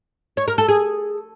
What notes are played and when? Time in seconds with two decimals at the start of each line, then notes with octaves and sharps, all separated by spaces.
0.37 C#5
0.48 A#4
0.58 A4
0.68 G#4